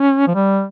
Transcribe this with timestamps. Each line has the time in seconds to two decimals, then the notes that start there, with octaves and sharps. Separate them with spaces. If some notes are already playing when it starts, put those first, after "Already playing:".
Already playing: C#4
0.28 F3
0.35 G3